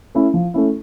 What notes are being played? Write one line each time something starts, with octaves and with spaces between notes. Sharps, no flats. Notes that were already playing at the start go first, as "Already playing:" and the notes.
A3 C#4 E4
F3
A3 C#4 E4